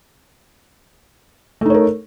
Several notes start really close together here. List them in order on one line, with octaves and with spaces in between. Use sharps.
A3 D#4 C#5 A#4